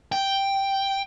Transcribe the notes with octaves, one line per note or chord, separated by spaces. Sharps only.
G5